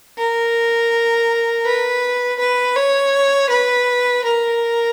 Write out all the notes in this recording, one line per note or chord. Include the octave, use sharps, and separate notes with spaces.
A#4
B4
B4
C#5
B4
A#4